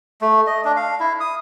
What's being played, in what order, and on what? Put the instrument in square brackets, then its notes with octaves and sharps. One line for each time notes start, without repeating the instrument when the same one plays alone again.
[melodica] A3
D#5
D4
F5
E4
D#6